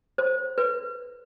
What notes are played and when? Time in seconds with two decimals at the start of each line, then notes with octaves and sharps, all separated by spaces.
0.18 C5
0.58 B4